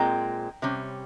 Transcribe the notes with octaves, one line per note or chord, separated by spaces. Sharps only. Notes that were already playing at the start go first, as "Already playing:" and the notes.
Already playing: A#2 G#3 C4 G5 A#5
C3 G3 C#4